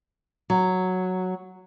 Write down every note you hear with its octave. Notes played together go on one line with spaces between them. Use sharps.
F#3